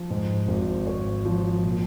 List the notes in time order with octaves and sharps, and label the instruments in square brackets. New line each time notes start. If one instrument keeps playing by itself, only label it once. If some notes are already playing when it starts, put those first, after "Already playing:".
Already playing: [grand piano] F3
G#2
G#1
G#1 C#5
F3
A#2